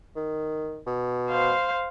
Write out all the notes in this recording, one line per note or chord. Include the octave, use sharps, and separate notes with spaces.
D#3
B2
C5 F5